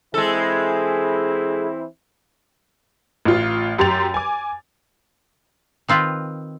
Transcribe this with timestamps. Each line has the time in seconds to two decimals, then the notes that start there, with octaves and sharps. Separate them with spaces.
0.14 E3 G#3 C4 E4 A4
3.25 A1 F4
3.78 F#2 G4 C6 A6 F7
4.14 G#5 D6
5.88 D#3 C4 F4 B4